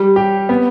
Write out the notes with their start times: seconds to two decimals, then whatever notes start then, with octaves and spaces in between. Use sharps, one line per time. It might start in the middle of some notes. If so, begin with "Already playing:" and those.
Already playing: G3
0.16 G4
0.49 B3